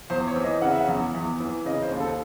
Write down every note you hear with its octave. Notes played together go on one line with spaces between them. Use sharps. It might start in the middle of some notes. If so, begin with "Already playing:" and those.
E2 C5
C#5
E3
D#5
C#3 F#5
E5
F#5
E2
E2
E3
C#3 D#5
C5
D#2
A4